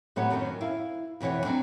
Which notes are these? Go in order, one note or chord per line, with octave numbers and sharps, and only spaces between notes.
A2 F#3 B3 G4 C#5 F#5
F#2 D#3 F#3 C#4 D#4
E4 F5
F2 B2 E3 C#5 F#5
F#3 C4 D4